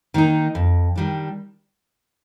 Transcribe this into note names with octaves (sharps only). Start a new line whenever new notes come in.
D#3 A#3 D#4
F2
D#3 G3 D4